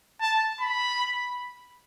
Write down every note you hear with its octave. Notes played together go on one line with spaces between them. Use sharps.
A5
B5